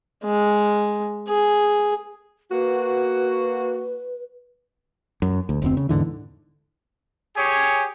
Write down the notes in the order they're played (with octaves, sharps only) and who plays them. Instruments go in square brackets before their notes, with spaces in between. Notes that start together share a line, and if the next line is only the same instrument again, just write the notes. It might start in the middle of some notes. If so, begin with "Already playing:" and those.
[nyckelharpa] G#3
G#4
[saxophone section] A#3 F#4 [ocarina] B4
[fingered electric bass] F#2
D2
F1 D2 C4
C#3
E2 G#2 D3 E3
[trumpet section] G4 G#4 C#5 G#5